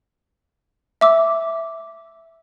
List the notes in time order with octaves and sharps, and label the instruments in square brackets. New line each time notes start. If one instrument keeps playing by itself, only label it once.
[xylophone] E5 D6 E6